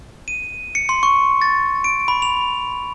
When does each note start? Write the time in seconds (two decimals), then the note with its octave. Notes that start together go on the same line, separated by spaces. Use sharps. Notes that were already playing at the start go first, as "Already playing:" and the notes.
0.28 D#7
0.75 C#7
0.89 C6
1.03 C#6
1.42 A6
1.84 D7
2.08 B5
2.22 F7